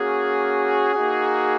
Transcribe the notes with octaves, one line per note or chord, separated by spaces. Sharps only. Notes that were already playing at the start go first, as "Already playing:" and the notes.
Already playing: A#3 C#4 F#4 G#4
A#3 D#4 F#4